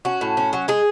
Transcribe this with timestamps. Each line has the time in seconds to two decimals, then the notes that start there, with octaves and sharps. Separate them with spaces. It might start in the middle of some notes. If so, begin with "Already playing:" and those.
0.05 C#4 F#4
0.21 A2
0.37 C#4
0.53 F#3
0.68 G#3 G#4